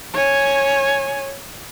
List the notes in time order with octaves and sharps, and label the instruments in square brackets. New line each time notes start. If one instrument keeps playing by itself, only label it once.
[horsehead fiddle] C#5 G#5